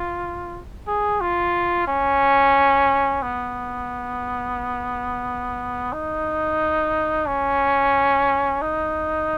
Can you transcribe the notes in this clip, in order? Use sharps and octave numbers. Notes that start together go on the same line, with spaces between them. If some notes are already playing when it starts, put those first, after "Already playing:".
Already playing: F4
G#4
F4
C#4
B3
D#4
C#4
D#4